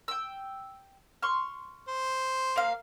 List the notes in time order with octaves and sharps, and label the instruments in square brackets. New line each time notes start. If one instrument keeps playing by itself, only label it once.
[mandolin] G5 E6
C6 C#6 F6
[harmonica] C5
[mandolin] A#3 F5